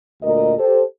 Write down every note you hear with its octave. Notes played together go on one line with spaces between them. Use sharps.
D2 A#2 A#4 D#5
G4 A4 C5